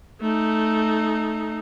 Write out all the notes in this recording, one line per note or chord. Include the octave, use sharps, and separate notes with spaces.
A3 D#4